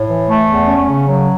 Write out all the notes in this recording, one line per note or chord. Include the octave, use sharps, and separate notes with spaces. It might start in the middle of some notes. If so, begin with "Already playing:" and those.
Already playing: A2
E3
A3
E2
C#4
C#3
F#3